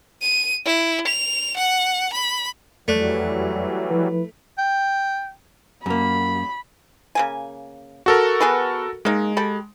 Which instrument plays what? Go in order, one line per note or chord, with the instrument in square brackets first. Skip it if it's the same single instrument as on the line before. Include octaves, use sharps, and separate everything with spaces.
[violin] D#7
E4
F7
F#5
B5
[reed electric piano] F2 D5 F#6 [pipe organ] E3 F#3 G3 [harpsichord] A3
[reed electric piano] F3 E4 B4
[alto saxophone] G5
[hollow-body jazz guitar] F#2 A#3 [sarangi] B5
[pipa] C#3 A#3 G#5
[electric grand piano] F#4 A4 A#4
[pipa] B3 G#4 B4
[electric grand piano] G#3 [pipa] A#3 D#4
[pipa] G4 A4 B5